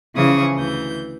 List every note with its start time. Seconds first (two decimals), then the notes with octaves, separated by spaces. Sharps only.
0.16 C#3 E3 F3 C#6 D#6
0.55 D2 E3 G6